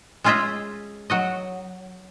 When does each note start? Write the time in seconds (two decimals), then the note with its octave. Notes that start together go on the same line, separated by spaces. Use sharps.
0.24 G#3 C#4 F4 G#4 D#5 E5
1.10 F#3 F#4 D#5